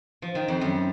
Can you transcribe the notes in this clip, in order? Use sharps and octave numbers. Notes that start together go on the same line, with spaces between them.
F3
D#3
F2
F#2